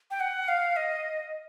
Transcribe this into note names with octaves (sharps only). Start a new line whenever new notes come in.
G5
F#5
F5
D#5